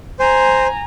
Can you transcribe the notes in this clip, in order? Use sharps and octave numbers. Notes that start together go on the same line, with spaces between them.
C5 G#5 A#5